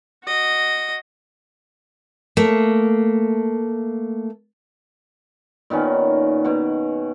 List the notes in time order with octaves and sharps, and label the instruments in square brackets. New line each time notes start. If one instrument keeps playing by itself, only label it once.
[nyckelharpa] F#4 D#5
[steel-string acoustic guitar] A3 A#3
[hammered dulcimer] A#2 D#3 B3 C#4
B2 F#5